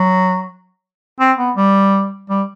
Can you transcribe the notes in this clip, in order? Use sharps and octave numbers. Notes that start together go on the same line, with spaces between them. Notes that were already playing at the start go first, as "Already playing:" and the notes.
Already playing: F#3
C4
B3
G3
G3